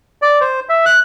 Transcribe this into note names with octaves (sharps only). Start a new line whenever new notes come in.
D5
C5
E5
F#6